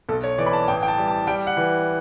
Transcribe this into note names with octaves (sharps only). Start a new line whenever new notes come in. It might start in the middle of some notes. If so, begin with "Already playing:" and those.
B1 A4
C#5
E3 D5
B5
A5
A1 G5
G5
A5
G3
A5
G3 G5
F#5
E3